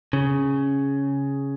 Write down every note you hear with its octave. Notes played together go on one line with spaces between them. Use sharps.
C#3